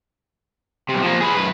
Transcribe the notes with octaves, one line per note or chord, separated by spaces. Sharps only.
B1 C3
F3 A#3
G#4 B4
F#2 B4